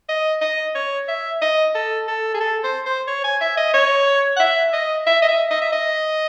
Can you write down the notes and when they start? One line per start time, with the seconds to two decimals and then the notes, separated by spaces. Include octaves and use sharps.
0.09 D#5
0.42 D#5
0.75 C#5
1.08 E5
1.42 D#5
1.75 A4
2.08 A4
2.34 G#4
2.41 A4
2.64 C5
2.86 C5
3.08 C#5
3.24 G#5
3.41 E5
3.57 D#5
3.74 C#5
4.36 F#5
4.40 E5
4.73 D#5
5.07 E5
5.22 D#5
5.29 E5
5.51 D#5
5.62 E5
5.73 D#5